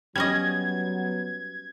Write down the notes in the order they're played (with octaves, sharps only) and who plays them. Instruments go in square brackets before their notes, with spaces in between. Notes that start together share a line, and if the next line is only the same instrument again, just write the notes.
[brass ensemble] F#3 B3 [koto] G3 C#4 D#5 [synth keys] G#6